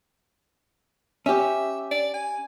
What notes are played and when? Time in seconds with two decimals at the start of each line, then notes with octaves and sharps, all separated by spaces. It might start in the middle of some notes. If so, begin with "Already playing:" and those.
1.26 C#4 G4 E5
1.91 D5
2.14 G#5